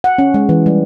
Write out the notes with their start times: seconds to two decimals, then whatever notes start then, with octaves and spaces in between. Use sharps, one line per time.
0.04 F#5
0.18 C#4
0.34 G#3
0.49 E3
0.66 G3